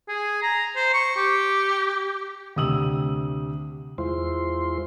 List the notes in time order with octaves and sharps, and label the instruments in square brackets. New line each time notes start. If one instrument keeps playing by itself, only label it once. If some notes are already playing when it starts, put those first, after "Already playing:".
[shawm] G#4
A#5
C5
C#6
G4
[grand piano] D2 C3 D#6 E6 F#7
[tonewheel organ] E2 G#3 E4 F4 C5 C6